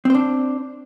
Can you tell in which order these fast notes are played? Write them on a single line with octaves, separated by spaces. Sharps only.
C4 C5 D4